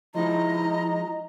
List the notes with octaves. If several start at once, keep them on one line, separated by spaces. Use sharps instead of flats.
F3 G#3 D#4 E4 D#5 A#5